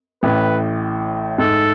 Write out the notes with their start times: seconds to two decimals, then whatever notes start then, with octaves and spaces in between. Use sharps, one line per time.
0.23 A1 A2 B4
1.38 G#2 A4